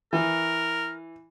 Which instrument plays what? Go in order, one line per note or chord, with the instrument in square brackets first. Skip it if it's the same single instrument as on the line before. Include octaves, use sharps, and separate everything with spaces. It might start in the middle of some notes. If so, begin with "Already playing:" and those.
[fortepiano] E3 [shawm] A#4